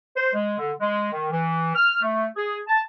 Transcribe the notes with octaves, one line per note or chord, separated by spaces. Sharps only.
C5
G#3
D3
G#3
D#3
E3
F6
A3
G#4
A5